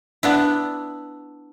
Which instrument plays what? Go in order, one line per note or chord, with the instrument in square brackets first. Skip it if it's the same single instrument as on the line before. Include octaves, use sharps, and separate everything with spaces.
[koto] B3 D4 E4